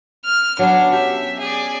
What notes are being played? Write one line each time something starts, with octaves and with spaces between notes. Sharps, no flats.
F6
F#3 B3 C#4 D4
G4 E5
G#4 D5